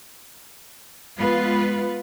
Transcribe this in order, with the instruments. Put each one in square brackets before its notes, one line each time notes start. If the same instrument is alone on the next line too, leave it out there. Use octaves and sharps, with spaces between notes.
[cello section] G#3 B3 F4 B4